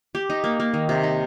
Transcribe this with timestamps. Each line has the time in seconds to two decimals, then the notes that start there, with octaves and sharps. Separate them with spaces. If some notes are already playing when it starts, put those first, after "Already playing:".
0.15 G4
0.30 D#4
0.44 A#3
0.60 A#3
0.74 D#3
0.89 C3
1.03 D#4